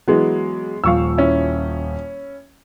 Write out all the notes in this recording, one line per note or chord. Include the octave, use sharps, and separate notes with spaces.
E3 F#3 G#3 B3
D#1 F3 F5 C#6 E6
C#4 E4